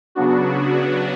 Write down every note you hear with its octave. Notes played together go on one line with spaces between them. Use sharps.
C#3 F#3 B3 D4 F#4